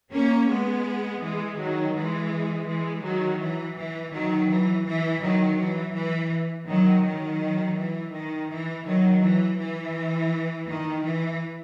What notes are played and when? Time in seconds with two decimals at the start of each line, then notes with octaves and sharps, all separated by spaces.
0.13 A#3 C#4
0.49 G#3 B3
1.22 E3 G#3
1.58 D#3 F#3
1.94 E3 G#3
2.67 E3 G#3
3.04 D#3 F#3
3.40 E3
3.76 E3
4.12 D#3 F#3
4.49 E3
4.86 E3
5.22 D#3 F#3
5.58 E3
5.95 E3
6.67 D#3 F#3
7.03 D#3 F#3
7.77 E3
8.13 D#3
8.49 E3
8.85 D#3 F#3
9.22 E3
9.58 E3
10.67 D#3
11.04 E3